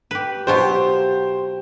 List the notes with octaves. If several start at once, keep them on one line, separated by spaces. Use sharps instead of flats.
G4 B4
B2 F#3 F4 G4 C5